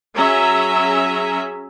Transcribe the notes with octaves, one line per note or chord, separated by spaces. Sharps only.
F#3 C#4 G#4 E5 A#5